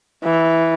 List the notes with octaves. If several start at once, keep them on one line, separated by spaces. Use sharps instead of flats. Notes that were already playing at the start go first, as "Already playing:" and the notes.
E3